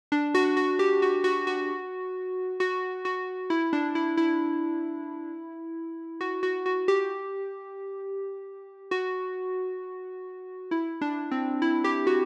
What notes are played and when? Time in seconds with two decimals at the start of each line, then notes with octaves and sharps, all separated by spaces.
0.12 D4
0.35 F#4
0.57 F#4
0.79 G4
1.02 F#4
1.24 F#4
1.47 F#4
2.60 F#4
3.05 F#4
3.50 E4
3.73 D4
3.95 E4
4.17 E4
6.21 F#4
6.43 F#4
6.66 F#4
6.88 G4
8.91 F#4
10.71 E4
11.01 D4
11.31 C4
11.62 E4
11.84 G4
12.07 F#4